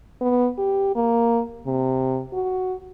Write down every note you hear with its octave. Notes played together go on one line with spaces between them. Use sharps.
B3
G4
A#3
C3
F#4